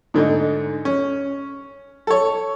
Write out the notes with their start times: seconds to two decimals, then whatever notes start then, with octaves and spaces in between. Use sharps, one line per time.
0.14 G#2 D3 A3 D#4
0.85 C#4
2.07 A4 C#5